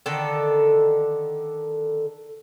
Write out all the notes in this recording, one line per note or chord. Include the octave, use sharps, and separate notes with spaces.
D3 D#3 A4